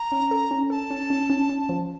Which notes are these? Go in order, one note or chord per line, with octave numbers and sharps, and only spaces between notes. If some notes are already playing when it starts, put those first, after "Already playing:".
Already playing: A#5
C#4
A4
C#4
A4 A5
C#4
C#4
C#4
C#4
F3